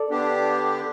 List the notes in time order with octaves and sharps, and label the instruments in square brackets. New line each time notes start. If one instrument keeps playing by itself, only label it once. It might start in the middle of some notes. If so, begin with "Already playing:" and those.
Already playing: [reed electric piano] A4 D5
[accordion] D3 B3 D4 G4